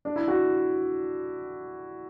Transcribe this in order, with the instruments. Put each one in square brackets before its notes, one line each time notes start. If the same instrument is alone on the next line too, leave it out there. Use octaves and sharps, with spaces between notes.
[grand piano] D4
E4
F#4